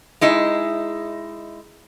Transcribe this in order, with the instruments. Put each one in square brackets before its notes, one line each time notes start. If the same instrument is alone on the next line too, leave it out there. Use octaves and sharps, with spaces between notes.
[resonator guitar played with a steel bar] G#3 D#4 E4 G#4